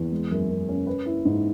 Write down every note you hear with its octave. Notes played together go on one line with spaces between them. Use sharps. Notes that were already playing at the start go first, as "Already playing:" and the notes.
Already playing: E2
G#3
F#2
F#2
C#4
B4
E4
G#2